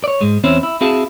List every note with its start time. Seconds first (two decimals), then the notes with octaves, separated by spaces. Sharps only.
0.04 C#5 D5
0.21 G#2 G#3
0.44 E2 C4 C#4 E4
0.63 E4
0.81 C4 E4 F#4 G#4 F5 A5